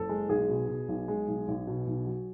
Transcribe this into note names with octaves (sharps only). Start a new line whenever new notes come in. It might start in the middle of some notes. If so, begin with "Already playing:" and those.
Already playing: F#1 A4
G#3
B1 G#4
B2
B2
B1
G#3
B1
B1
B2
B1
F#3